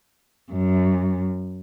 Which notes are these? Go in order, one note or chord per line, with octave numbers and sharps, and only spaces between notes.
F#2